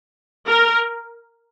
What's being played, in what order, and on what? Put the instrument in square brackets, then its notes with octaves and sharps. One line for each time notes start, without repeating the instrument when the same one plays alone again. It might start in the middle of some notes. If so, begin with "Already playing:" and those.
[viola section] A#4